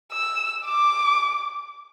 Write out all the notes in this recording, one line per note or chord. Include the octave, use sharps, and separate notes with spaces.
E6
D6